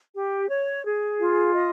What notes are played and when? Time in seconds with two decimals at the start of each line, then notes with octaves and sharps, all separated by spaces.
0.15 G4
0.49 C#5
0.84 G#4
1.20 F4
1.54 D#5